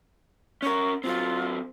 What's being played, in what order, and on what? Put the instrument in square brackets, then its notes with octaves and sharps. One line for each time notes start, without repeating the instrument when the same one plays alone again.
[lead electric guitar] C#4 A#4 [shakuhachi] C#6
[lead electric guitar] F#3 C4 [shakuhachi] F4